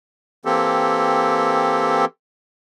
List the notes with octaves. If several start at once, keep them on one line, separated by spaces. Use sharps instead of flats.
E3 A#3 C4 G4 A4